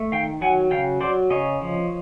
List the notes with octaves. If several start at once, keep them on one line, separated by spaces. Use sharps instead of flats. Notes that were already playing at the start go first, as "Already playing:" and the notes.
Already playing: A3
D#3 F5 G5
F#3 F#5 G#5
C#3 F5 G5
F#3 C5 D5
C#3 C#5 D#5
F3